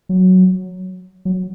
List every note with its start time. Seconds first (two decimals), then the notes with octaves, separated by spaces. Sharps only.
0.09 F#3
1.25 F#3